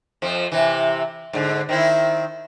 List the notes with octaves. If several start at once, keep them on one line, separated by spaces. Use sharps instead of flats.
F2 F3
C3 E3
G#2 D3
D#3 C4 E4